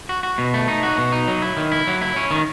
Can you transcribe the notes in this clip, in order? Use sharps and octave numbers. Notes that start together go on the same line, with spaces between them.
F#4
F#4
B2
A3
D#4
F#4
B2
D#4
F#3
E4
D#3
E4
F#3
E4
C#4
D#3